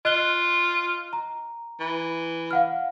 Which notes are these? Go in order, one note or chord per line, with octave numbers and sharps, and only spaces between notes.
F4 D#5 F#6 G7
A#5
E3
F5 F#5 F6